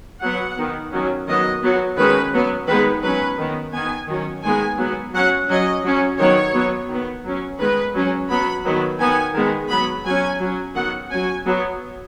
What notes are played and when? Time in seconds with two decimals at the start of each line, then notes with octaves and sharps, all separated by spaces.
0.22 F#3 B3 F#5
0.57 D#3 B3
0.92 D#3 F#3 C#4
1.27 D#3 F#3 B3 D#5
1.63 F#3 B3
1.97 D#3 G#3 C#4 B4
2.33 F#3 B3
2.68 D#3 G#3 B3 B4
3.02 F#3 C#4 B4
3.38 D#3 B3
3.73 D#3 B3 G#5
4.08 D#3 F#3 C#4
4.43 D#3 G#3 B3 G#5
4.78 F#3 B3
5.14 F#3 C#4 F#5
5.49 F#3 C#4 D#5
5.84 F#3 C#4
6.19 D#3 F#3 B3 C#5
6.54 F#3 B3
6.89 D#3 B3
7.25 F#3 C#4
7.59 D#3 G#3 B3 B4
7.95 F#3 C#4
8.29 F#3 B3 B5
8.65 D#3 F#3 B3
9.00 D#3 B3 G#5
9.35 D#3 G#3 B3
9.69 F#3 B3 B5
10.05 F#3 C#4 G#5
10.40 F#3 C#4
10.75 D#3 F#3 B3 F#5
11.10 F#3 C#4 G#5
11.46 F#3 B3